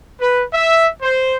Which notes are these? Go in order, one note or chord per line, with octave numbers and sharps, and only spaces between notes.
B4
E5
C5